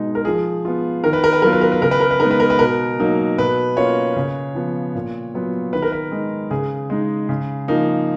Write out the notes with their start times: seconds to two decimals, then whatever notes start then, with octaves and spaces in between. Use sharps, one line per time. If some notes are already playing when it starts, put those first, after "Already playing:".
Already playing: B2 G#3 D#4
0.15 A#4
0.25 F3 G#4
0.65 B3 F4
1.04 D#3 A#4
1.13 B4
1.24 A#4
1.33 B4
1.42 F#3 B3 F4 A#4
1.53 B4
1.61 A#4
1.72 B4
1.82 C#3 A#4
1.91 B4
2.00 A#4
2.11 B4
2.20 G#3 B3 D#4 A#4
2.31 B4
2.40 A#4
2.50 B4
2.59 B2 A#4
3.00 F#3 A#3 D#4
3.38 B2 B4
3.77 A#3 C#4 F4 C#5
4.16 C#3
4.55 F3 B3
4.95 A#2
5.34 F#3 B3 F4
5.73 D#3 B4
5.82 A#4
5.92 B4
6.11 G#3 D#4
6.51 C#3 G#4
6.90 G#3 D#4
7.29 C#3
7.68 F3 A#3 D#4